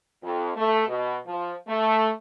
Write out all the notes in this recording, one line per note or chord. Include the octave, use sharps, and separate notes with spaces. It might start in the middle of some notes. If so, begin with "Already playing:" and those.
F2
A3
B2
F3
A3